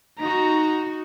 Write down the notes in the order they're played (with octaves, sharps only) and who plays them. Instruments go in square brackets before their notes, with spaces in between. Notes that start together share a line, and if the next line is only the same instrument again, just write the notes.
[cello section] D#4 F#4 [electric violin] A#5